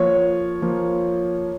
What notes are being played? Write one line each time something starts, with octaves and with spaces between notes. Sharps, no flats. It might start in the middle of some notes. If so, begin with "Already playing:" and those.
Already playing: F3 A#3 F4 C#5
F3 A#3 F4